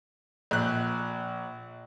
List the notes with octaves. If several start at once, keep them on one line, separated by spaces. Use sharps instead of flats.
A#1 F#6